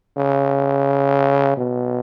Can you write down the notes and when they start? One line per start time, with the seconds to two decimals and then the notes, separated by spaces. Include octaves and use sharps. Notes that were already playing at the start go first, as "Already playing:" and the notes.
0.17 C#3
1.57 B2